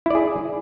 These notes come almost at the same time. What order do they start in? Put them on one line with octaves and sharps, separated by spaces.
E4 D5 G#4